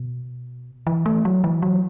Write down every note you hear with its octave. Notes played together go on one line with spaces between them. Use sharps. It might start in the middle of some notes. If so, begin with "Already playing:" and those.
Already playing: B2
E3
A3
F#3
E3
F#3